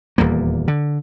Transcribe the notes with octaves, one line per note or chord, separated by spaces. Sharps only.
D#1 E2 G3 A#3
D3